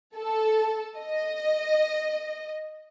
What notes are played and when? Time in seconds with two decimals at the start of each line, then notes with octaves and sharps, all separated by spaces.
0.16 A4
0.98 D#5